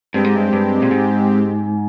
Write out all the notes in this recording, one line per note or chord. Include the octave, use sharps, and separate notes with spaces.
G2 G#3 C4 G4
G#2
G2
G2
A#2
G#2